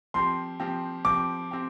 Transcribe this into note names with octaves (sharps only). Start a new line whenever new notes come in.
F3 C4 G4 C6
F3 C4 G4
F3 C4 G4 D6
C4 G4